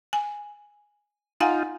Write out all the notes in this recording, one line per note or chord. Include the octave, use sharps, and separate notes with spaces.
G#5
D#4 F4 F5 F#5 G#5